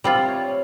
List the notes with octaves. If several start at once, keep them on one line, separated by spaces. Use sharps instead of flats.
G3 C4 F4 E5
C#5